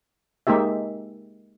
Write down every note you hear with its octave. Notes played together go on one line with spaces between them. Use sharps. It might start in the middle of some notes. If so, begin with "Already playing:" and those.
G#3 A#3 D#4 G4 E5